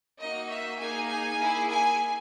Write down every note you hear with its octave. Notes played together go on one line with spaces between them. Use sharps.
A#3 D#4 F#4 D#5
E5
A#3 D#4 G#4 G#5
G#5
A#3 E4 G#4
G#5